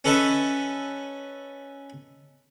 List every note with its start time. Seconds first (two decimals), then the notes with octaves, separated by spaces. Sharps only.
0.04 C#4 A4 B4 D#5 E5 A5